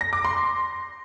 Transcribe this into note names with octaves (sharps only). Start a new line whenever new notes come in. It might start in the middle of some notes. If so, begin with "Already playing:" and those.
A#6
D6
C6